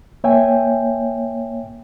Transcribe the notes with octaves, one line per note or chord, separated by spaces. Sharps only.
A#3 C#5 E5 G5 G#5